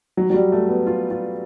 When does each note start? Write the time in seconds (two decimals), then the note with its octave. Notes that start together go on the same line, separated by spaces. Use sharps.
0.17 F#3
0.30 F#3
0.34 G3
0.52 A3
0.69 B3
0.87 F4
1.10 F4